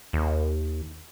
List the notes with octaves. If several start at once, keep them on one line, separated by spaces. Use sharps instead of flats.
D#2